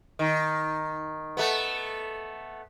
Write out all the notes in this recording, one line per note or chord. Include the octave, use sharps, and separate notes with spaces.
D#3
A3 B3